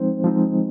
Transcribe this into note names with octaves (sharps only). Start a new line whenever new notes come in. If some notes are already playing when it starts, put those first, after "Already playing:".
Already playing: F3 G#3 C4 D#4 C5
F3 G#3 C4 D#4